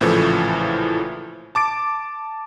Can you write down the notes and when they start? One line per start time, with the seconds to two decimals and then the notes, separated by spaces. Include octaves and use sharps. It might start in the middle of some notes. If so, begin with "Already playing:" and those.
0.01 A#1 A2 C#3 E3 F3 A3
1.55 A5 D6 A6 D7